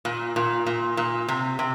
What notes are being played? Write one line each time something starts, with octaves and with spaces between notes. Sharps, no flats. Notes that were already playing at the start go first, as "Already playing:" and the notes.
A#2
A#2
A#2
A#2
C3
C3